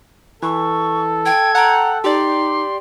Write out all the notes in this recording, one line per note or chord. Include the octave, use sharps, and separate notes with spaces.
E3 A4 C#6
G5 G#6
F#5 G5 A#5
D#4 G4 D5 C6